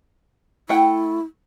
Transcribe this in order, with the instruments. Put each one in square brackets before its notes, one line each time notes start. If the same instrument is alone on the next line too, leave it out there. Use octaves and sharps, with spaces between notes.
[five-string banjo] A3 F#5 G5 [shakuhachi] E4